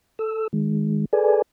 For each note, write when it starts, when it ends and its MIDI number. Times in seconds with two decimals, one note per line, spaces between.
0.19 0.48 69
0.19 0.48 88
0.53 1.05 51
0.53 1.05 56
1.13 1.42 68
1.13 1.42 69
1.13 1.42 71
1.13 1.42 74
1.13 1.42 80